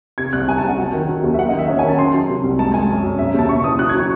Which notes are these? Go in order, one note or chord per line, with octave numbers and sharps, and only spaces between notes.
C3 G#6
C2 F#6
C2 G#5
A5
C2
F#5
F#3
D#3
F#3
D#2
E5
F#3 F#5
D#5
D#3
E5
C#4 F#5
G#5
D#3
A5
F#3 C6
F#3
C3
C2
G#3 A5
G#3 G#5
F#2
F#2
E1 E5
E5
D#2 A5
C#3 C#6
E3 D#6
F#3 F#6
G#6
F#3
C#6